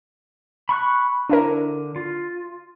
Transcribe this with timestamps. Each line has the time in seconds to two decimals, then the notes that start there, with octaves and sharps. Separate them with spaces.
0.69 B5 C#6 F#6
1.29 D3 D4 E4 A#4
1.96 F4